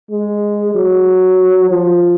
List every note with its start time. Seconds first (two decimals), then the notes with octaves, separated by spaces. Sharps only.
0.11 G#3
0.75 F#3
1.70 F3